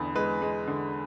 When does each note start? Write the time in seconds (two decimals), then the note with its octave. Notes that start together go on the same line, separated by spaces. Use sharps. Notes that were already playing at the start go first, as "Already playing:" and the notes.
Already playing: E2 D3 B3 B5
0.15 G#3 B4
0.42 G#3
0.67 D3